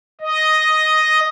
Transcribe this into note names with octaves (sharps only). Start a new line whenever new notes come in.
D#5